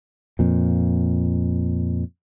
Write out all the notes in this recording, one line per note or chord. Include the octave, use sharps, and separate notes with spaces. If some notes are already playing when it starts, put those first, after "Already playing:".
F2 A#2